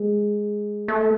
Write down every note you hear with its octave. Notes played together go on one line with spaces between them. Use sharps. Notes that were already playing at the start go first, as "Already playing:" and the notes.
Already playing: G#3
A3